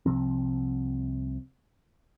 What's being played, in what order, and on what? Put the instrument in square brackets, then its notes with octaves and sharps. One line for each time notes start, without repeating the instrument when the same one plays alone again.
[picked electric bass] C2 C3 F3 C4